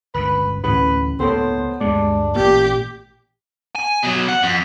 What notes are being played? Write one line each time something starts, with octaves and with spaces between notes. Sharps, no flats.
G1 C#2 D3 B4
A1 D2 C#3 A3 B4
C#2 A2 A#3 B3 A4 C5 C#5
D2 G2 G#3 D4
A1 A#2 G4
G#5
B2 F#3
F#5
F2